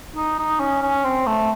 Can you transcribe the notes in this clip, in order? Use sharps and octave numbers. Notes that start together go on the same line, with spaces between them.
D#4
D#4
C#4
C#4
C4
A3